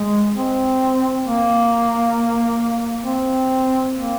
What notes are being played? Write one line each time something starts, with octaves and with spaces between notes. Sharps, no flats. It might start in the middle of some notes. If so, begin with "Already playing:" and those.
Already playing: G#3
C4
A#3
C4
A#3